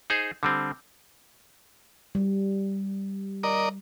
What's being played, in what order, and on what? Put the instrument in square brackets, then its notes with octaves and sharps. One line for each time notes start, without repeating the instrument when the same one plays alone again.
[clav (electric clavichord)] D#4 G#4 C5
D3 G3 C4
[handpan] G3
[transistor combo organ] A#4 D5 D#5